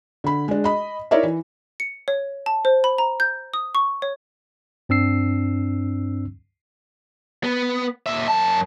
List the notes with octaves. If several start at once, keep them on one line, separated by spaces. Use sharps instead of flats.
D3 B5
G#3 D4
D#5 B5
D#4 E4 A#4 C#5 D5 E5
E3
C#7
C#5
A5
C5
B5
A#5
G6
D#6
C#6
C#5
G2 C4 D4 E6 C7
B3
A#2 E5
F#2 A5